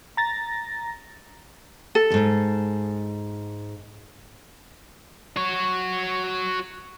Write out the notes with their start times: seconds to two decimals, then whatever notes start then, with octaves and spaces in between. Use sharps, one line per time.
0.17 A#5 A6 A#6
1.95 A4
2.10 E2 G#2
5.37 F#4 C#5